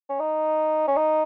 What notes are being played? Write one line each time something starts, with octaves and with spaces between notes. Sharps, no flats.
C#4
D#4
C#4
D#4